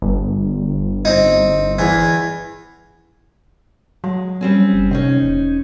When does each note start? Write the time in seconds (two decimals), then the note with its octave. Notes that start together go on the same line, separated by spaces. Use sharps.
0.02 G1
1.05 C4 D#4
1.79 E2 E3
4.04 F#3 G#3
4.41 G3 C4 C#4
4.73 F#1
4.91 C3 C#4 D#4 C5
5.22 E1